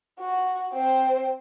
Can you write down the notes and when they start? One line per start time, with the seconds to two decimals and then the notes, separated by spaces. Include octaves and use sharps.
0.20 F#4
0.73 C4 C5